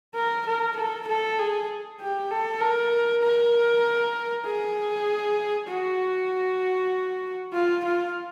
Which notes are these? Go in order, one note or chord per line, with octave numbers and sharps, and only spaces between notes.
A#4
A#4
A4
A4
G#4
G4
A4
A#4
A#4
G#4
F#4
F4
F4